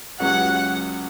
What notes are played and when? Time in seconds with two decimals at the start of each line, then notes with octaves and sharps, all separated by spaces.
0.20 C#2 C#3 F#3 C#4 G4 F#5